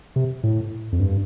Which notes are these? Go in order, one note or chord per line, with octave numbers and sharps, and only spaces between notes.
C3
A2
F2
G2